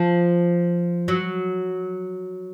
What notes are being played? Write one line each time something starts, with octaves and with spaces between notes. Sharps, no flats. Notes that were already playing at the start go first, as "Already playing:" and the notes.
Already playing: F3
F#3